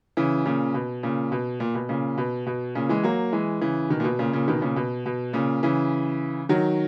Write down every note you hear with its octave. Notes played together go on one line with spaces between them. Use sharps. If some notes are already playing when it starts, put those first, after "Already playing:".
C#3 E3
A#2 C#3
B2
A#2 C#3
B2
A#2
B2
A#2 C#3
B2
B2
A#2 C#3
E3 G#3
F#3 A#3
E3 G#3
C#3 E3
B2 D#3
A#2
B2
A#2 C#3
A#2 C#3
B2 D#3
A#2 C#3
B2
B2
A#2 C#3
C#3 E3
D#3 F#3